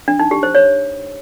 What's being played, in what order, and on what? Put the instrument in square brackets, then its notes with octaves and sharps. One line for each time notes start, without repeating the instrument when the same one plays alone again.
[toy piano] D4
D#4
G4
C5
C#5